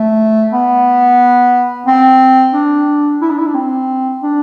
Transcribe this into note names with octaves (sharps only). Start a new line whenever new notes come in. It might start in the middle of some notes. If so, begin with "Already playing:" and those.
Already playing: A3
B3
C4
D4
E4
D4
E4
D4
C4
D4